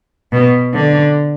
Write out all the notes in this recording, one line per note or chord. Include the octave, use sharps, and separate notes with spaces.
B2
D3